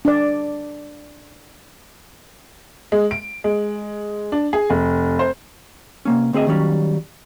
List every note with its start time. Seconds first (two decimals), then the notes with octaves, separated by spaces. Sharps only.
0.05 D4 D5
2.92 G#3
3.11 D7
3.44 G#3
4.32 D4
4.53 G#4
4.70 F1
5.19 C5
6.05 C3 A#3 C#4
6.33 D2 C4 G#4 D#5 E5
6.47 D#3 F#3 G3 C#4